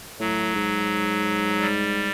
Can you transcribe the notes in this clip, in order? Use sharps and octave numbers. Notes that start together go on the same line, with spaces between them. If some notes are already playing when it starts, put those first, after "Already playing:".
A2 F#3
G#2
G3